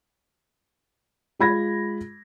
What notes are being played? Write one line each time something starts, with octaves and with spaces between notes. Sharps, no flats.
G#3 F4 B5 G#6 A#6